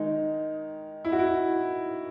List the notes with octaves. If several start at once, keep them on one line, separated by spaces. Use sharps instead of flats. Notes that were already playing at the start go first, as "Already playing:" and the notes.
Already playing: D#3 G#3 D#4
E4
F#4
E4